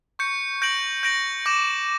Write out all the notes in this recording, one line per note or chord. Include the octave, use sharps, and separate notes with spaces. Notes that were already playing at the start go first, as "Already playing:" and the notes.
C#6 G6 C#7
G6 A#6 D7 F#7
G6 A#6 D7 F#7
D6 G6 A#6 E7